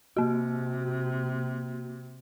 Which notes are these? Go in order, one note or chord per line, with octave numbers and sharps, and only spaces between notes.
C3 A#3 F#4